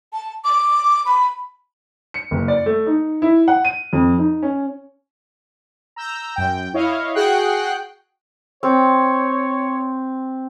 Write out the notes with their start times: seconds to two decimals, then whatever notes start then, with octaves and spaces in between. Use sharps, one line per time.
0.13 A5
0.44 D6
1.06 B5
2.14 C#7
2.31 F#1
2.48 D5
2.66 A3
2.86 D#4
3.22 E4
3.48 F#5
3.65 D#7
3.93 F2
4.18 D#4
4.43 C#4
5.96 A#5 E6 G6 A#6
6.34 F#2 G5 G6
6.74 E4 C#5 D#5 F5
7.15 F#4 G#4 F#5 G5 F#6 C7
8.63 C4 C#5